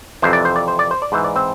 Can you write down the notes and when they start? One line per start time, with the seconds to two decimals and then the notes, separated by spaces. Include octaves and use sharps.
0.22 F2 C3 E3 C5
0.33 D5
0.45 C5
0.56 D5
0.68 C5
0.79 D5
0.91 C5
1.02 D5
1.12 G#2 E3 C5
1.24 D5
1.36 C4 C5